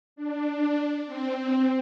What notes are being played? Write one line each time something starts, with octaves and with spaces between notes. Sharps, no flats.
D4
C4
C4